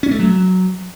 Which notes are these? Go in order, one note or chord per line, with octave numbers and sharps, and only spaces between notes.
C#4
A3
F#3